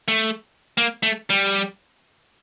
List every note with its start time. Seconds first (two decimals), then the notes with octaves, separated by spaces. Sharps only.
0.08 A3
0.78 A#3
1.03 A3
1.30 G3